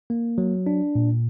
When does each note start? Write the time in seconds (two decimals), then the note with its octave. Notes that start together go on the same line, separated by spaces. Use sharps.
0.10 A#3
0.38 F#3
0.66 D4
0.95 A#2